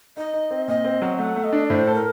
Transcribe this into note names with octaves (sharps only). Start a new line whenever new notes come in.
D#4 D#5
D#4
C4
A#2 D#5
C4
F#3
A3 F#5
A3
D#5
D4
D5
A2 C5
A4
A#4